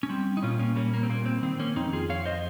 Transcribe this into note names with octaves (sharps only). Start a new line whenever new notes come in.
C#4
G3 C4
D#4
A#2 C#4 F4
A#3 C#4
G3 A#3 C#4
A#3
C4
A#2 A#3
C4
D#3 C4
A#3 C#4
F2 C4 D#4
F4 G#4
F2 C#5 F5
C5 D#5